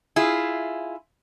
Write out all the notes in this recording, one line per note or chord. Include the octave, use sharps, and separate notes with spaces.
E4 F4 G#4